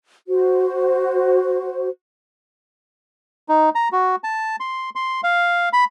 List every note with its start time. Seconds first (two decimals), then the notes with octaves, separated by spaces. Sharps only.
0.27 F#4 C5
3.49 D#4
3.75 A#5
3.92 F#4
4.24 A5
4.60 C6
4.95 C6
5.24 F5
5.73 B5